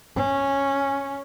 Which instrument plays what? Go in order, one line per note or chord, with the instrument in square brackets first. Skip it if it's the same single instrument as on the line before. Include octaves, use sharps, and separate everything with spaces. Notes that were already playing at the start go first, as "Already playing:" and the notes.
[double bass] C#4